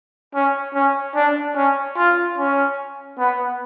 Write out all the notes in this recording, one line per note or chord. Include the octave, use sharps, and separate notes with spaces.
C#4
C#4
D4
C#4
F4
C#4
B3